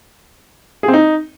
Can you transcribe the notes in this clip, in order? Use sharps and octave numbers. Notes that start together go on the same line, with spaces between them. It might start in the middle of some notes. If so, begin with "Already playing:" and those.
G#4
C4
D#4